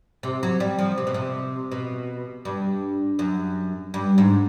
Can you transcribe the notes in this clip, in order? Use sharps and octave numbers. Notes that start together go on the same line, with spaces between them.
C3
F#3
G3
F3
C3
B2
C3
B2
G2
F#2
G2
G#2